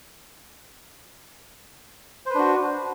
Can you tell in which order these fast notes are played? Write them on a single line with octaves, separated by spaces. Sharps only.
C5 B4 D4 F#4